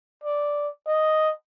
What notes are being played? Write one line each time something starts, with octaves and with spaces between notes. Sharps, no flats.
D5
D#5